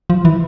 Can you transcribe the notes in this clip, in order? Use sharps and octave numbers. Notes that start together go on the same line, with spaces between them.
F3
E3